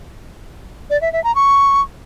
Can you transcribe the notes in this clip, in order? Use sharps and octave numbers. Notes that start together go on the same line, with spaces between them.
D5
E5
E5
A#5
C#6